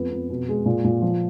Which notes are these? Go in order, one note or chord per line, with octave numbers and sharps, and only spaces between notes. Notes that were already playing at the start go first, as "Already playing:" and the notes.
Already playing: F2 B3
F2
B2
G#3
A#2
A#2
F3